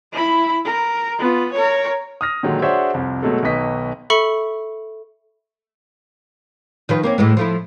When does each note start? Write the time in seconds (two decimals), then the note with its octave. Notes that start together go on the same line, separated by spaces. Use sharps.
0.12 E4 B5
0.65 A#4
1.19 B3 F4
1.52 A#4 C#5
2.21 D#6 F6 A#6
2.43 A#2 D3 D#3 F#3 G#3
2.62 D4 F#4 G#4 C5 C#5 E5
2.94 C2 F2
3.22 B2 F#3 G#3 A3 A4
3.43 B1 B2 D#3 B4 D#5 B6
4.10 A4 E5 B5 C#6 C#7 F#7
6.89 D#3 F3 B4
7.03 A#3 C4 C#4
7.18 A2 E3 G#3
7.37 F3 A3 E4